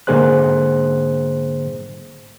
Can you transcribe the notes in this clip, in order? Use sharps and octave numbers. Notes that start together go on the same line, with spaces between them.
G#2 D3 A#3 G#4 C5 F#6